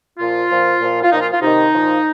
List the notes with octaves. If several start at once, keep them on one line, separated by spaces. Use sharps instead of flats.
A#2 F3 F4
A#2 F3
A#2 F3
F4
A#2 F3 D#4
F4
F4
C3 D#3 D#4
A#2 F3